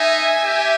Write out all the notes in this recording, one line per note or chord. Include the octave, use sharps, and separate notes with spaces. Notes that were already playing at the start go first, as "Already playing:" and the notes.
Already playing: D#4 E5 G#5
G4